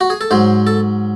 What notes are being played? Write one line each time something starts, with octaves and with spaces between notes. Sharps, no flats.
F#4
G#4
A4
G#2 F#3 C5
A4